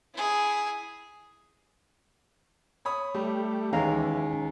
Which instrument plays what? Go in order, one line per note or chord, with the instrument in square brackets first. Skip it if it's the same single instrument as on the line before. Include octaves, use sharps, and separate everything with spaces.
[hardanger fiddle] E4 G#4
[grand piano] C#5 B5 D#6
[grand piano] G3 [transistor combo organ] A3 G4
[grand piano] D#2 G#3 [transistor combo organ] E3 [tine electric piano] C#4 F5 A#5